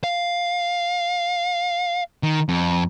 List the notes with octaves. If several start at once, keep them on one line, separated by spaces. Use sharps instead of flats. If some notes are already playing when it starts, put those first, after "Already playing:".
F5
D#3
F2